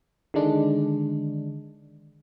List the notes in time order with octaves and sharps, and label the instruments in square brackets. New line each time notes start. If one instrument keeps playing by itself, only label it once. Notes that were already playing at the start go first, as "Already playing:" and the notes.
[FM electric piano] D3 D#3 G#3 D4